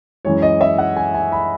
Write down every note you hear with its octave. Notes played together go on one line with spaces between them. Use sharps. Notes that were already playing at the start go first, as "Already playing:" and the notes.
F#2 E3 G#3 C#5
D#5
E5
F#5
G#5
G#5
B5